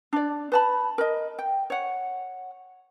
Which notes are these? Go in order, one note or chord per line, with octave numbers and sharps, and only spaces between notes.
D4 D5
B4 A5 B5
A#4 D#5
G5
C#5 F#5